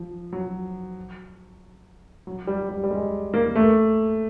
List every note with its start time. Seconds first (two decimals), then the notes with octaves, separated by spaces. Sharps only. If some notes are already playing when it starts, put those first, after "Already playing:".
Already playing: F3
0.33 F#3
2.27 F#3
2.47 G3
2.69 G3
2.84 G3
2.91 G#3
3.34 A#3
3.55 A3